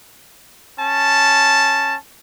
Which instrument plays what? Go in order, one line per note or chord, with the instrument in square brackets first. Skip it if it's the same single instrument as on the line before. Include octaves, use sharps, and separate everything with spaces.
[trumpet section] C#4 A5